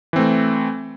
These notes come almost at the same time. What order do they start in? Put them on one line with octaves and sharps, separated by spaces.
E3 C4 A3